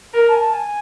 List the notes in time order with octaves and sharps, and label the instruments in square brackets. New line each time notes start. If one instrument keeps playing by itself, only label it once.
[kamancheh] A#4 [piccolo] A#5
[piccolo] A5
G#5
A5
G#5